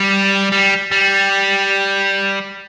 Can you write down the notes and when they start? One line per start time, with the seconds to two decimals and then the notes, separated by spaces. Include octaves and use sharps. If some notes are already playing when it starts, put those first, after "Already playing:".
Already playing: G3
0.52 G3
0.92 G3